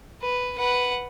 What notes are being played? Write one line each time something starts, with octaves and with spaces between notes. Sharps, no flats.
B4
B4 F#5